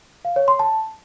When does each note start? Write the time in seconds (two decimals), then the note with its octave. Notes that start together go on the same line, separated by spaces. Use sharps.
0.25 F5
0.36 C#5
0.48 C6
0.59 A5